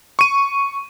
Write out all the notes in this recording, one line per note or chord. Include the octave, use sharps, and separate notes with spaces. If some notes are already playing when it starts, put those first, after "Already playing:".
C#6 D#7